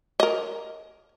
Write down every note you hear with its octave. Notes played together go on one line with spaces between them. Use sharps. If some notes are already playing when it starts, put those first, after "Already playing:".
A#4 D#5